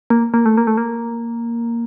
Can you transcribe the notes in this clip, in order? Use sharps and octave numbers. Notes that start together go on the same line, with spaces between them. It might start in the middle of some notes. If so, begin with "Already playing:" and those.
A#3
A#3
A3
A#3
A3
A#3